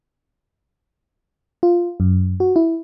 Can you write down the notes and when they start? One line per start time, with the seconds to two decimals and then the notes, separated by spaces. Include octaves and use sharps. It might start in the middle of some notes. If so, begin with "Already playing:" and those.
1.63 F4
2.00 F#2
2.40 F#4
2.56 E4